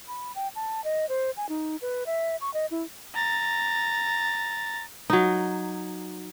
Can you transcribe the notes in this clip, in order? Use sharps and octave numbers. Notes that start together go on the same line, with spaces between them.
B5
G5
A5
D#5
C5
G#5
D#4
B4
E5
C#6
D#5
E4
A#5 A6
F#3 D#4